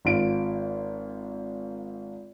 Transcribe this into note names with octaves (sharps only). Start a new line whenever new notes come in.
G#1 F4 D7